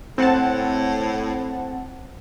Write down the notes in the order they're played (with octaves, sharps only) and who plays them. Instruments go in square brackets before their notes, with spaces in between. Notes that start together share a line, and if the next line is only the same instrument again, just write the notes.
[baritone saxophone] A2 [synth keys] C4 F#5 A5